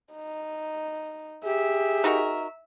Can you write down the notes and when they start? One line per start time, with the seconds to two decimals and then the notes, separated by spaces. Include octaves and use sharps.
0.14 D#4
1.45 G4 G#4 E5
2.04 D#4 F#4 A#4